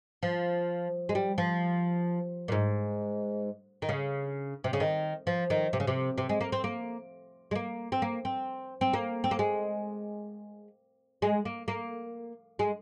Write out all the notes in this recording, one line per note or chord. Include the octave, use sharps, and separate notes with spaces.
F3
G#3
G3
F3
A#2
G#2
D#3
C#3
C3
C#3
D#3
F3
D#3
C3
C#3
C3
C3
G#3
A#3
C4
A#3
G#3
A#3
C4
A#3
C4
C4
A#3
C4
A#3
G#3
G#3
A#3
A#3
G#3